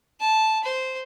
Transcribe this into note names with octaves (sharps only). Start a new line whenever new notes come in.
A5
C5